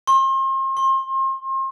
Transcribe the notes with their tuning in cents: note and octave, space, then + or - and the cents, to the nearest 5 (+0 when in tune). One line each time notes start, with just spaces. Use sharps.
C6 +40
C6 +35